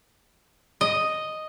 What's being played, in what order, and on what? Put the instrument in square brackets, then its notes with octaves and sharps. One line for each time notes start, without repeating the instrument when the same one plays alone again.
[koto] D#5